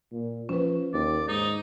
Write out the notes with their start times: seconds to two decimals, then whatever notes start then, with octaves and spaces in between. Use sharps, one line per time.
0.12 A#2
0.49 F3 C#4 B4
0.93 D#2 D5
1.28 G#2 D#4